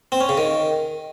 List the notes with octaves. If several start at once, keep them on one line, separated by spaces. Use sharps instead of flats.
C4
C#4
C#3
D#3